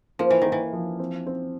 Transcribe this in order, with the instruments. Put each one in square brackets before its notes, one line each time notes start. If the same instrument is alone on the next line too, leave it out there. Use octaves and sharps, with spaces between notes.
[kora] F3 [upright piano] A#3
[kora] E3
[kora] D#3 [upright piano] A#3
[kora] E3
[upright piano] F3
C4
C4